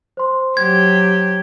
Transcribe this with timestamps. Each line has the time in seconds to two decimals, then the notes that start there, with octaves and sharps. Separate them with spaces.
0.17 C5 C6
0.57 F#3 G4 G#6